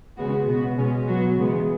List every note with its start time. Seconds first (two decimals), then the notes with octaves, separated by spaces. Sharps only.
0.17 C#3 G#3 B3 F#4
0.47 B2 B3 F#4
0.78 B2 G#3 C#4
1.07 F#3 B3 F#4
1.38 C#3 E3 G#3 B3